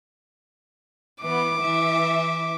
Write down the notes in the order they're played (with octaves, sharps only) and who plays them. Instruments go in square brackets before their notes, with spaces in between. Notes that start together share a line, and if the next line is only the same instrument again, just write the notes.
[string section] E3 B3 [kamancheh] D6
[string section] E3 E5